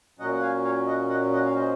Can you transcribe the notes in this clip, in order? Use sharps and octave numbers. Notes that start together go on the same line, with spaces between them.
A#2 F#3 C#4 D#5 F#5
F#5
F5 G#5
C#5 F5
D#5 F#5
D#5 F#5
D#5 F#5
F5
C5 D#5